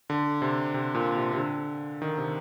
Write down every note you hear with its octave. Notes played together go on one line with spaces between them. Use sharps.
D3
C3
C3
A#2
C3
C3
D3
D#3
C3